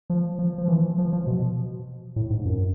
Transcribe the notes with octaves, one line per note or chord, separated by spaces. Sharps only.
F3
F3
F3
E3
F3
F3
B2
A2
G#2
F#2